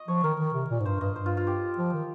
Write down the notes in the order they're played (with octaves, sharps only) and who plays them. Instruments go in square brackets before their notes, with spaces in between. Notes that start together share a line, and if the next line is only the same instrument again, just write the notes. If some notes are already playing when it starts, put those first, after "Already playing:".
Already playing: [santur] D#5
[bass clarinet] F3 [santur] C#5
[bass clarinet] D#3 [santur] A#4
[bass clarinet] D#3
C3
A#2
G#2
[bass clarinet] G2 [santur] C5
[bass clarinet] G2 [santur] D#5
[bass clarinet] G2 [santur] C5
[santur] F4
F4
G4
[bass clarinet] F3
D#3